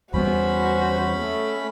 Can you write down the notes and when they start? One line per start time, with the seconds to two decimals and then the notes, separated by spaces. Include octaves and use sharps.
0.14 E2 G3 B3 C#4 F#4 C5 B5
1.19 A3